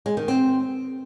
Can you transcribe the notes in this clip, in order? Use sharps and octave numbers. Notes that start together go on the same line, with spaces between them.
G#3
D#3
C4